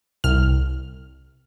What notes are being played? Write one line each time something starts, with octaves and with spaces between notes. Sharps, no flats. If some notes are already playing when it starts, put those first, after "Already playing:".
C2 F6